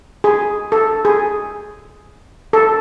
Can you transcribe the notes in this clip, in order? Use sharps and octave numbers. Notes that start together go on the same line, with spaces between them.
G#4
A4
G#4
A4